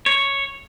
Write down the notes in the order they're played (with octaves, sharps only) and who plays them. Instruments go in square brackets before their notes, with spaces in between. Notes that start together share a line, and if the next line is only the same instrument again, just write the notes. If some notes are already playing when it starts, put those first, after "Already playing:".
[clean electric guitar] C#5